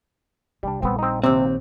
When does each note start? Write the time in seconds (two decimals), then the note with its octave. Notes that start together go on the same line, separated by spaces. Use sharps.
0.63 C2 G3 D4
0.82 A#1 G3 B3 C4
0.99 C4 D#4
1.24 D#2 C3 C4